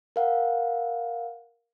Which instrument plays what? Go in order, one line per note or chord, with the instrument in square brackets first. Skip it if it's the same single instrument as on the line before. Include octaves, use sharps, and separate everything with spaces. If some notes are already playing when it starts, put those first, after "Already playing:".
[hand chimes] A#4 F5 F#5